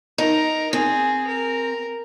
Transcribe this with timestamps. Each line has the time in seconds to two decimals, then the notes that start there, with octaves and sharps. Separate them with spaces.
0.18 D#4 A#4
0.73 C4 G#4
1.27 A#4